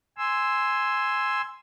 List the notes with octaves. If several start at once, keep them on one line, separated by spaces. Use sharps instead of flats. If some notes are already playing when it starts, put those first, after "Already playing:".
G#5 C6 E6